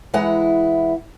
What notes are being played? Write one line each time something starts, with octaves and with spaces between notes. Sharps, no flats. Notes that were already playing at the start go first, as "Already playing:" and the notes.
E3 G#3 E4 F#5 A#5